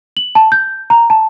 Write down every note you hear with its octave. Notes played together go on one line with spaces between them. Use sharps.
F#7
A5
G6
A#5
A5